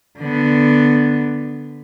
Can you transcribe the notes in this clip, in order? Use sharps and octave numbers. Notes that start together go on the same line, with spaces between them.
D3 B3